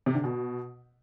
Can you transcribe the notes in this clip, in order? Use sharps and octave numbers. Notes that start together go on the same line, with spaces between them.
C3
D3
B2